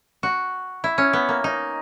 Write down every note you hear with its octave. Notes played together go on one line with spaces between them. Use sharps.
F#4
E4
C#4
B3
A#3
D#4